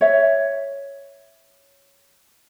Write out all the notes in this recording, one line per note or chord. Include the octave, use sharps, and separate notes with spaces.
C#5 E5